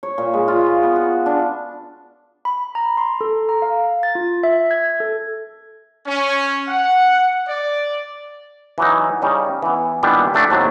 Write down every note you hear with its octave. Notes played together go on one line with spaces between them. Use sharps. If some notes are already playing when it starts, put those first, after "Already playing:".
C#5
A#2
G#3
F4
B4
B3
F#4
D4
B5
A#5
C6
A4
A#5
F5
A6
F4
E5
G#6
A4
C#4
F#5
D5
E3 F#3 D#4
C#3 G3 C#4 D#4
E3 B3
A#2 D#3 E3 G3 B3 D4
F#3 A3 D4
D#2 A2 C3 F#3